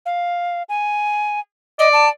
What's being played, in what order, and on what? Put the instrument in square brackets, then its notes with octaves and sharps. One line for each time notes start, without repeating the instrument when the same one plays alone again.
[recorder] F5
G#5
[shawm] D5 [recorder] D#5
[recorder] A5